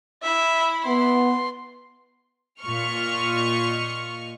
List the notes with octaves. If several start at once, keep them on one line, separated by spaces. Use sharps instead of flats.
E4 E5 B5
B3 C6
A#2 F4 D#5 C#6 F6